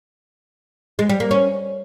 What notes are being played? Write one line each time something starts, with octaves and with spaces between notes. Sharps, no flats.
G#3
G3
A#3
C#4